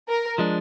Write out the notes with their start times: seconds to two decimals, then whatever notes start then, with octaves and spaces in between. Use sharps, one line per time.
0.09 A#4
0.38 F3 G#3 D4